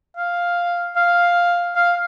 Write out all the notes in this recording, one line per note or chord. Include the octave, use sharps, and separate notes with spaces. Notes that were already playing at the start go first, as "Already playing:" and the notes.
F5
F5
F5